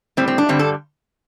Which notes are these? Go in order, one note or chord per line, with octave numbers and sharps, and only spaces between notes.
A2 G3 C4
C4
D4
G2 D3 G3 C4
A4